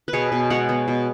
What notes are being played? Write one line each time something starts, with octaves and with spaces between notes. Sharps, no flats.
B4
B2 G#4 C#5
B2
G#3 C#5 F#5
B3
B2